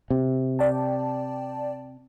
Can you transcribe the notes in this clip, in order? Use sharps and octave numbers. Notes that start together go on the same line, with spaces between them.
C3
D5 G5 A5